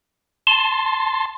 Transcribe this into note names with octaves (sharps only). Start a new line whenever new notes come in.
A5 C6